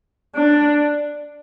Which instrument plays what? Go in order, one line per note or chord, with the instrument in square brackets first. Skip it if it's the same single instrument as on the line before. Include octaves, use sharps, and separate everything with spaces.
[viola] D4